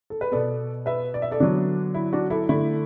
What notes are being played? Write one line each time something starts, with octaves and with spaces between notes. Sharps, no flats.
A4
B4
B2 B3 A4 D5
B4 E5
D5
E5
A4 D5
D3 F#3 B3 D4
E4
D4 F#4
E4 A4
D3 A3 E4